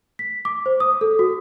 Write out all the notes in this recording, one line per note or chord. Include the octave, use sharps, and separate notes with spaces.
B6
D6
C5
D#6
A4
F#4